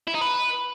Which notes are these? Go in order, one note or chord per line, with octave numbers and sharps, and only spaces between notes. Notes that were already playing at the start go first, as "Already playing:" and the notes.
E4
D#4
B4